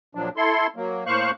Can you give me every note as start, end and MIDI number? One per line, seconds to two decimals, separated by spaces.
0.15 0.29 46
0.15 0.29 53
0.15 0.29 54
0.15 0.29 62
0.37 0.67 64
0.37 0.67 69
0.37 0.67 84
0.76 1.04 54
0.76 1.04 58
1.06 1.31 45
1.06 1.31 58
1.06 1.31 72
1.06 1.31 77
1.06 1.31 85
1.06 1.31 90